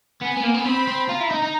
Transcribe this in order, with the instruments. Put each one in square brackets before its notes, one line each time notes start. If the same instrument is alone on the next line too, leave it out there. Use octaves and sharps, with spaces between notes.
[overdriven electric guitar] B3 [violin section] G#5
[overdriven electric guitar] B3
A#3
B3
[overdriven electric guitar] C4 [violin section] B5
[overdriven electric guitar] C4
[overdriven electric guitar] F4 [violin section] A#5
[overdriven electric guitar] E4
D#4
D#4